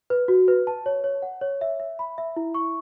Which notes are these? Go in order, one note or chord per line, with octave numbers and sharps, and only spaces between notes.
B4
F#4
B4
A5
C#5
C#5
F#5
C#5
E5
E5
B5
E5
E4
C#6